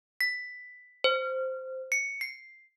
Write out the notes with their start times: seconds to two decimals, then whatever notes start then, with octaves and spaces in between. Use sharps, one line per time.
0.21 B6
1.04 C5
1.92 C#7
2.21 C7